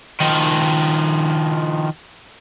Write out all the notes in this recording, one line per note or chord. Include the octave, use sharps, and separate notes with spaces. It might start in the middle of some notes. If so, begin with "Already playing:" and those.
D#3 F3